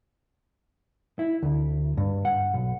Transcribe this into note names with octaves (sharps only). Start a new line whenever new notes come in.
E4
D2
G2
F#5
B1